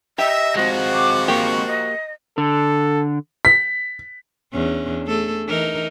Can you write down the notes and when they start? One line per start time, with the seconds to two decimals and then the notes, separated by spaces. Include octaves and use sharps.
0.18 G4 D#5 E5
0.56 F3 G#3 C4 F#4
0.93 D6
1.28 A#3 G4 C#6
1.67 D#5
2.38 D3 A4
3.45 B6
4.53 E2 C#4 D4
5.06 A3 G#4 A4
5.47 E3 D#4 A#4